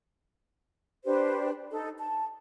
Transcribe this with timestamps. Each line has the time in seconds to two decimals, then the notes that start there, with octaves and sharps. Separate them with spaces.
1.05 D4 G4 B4 C5
1.71 D#4 A4
1.98 A5